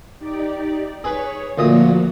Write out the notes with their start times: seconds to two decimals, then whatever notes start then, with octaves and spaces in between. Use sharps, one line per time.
0.19 D#4 G4 D5
1.04 G#4 B4 C#5
1.58 D2 A#2 F3 A#3 F#4 D#6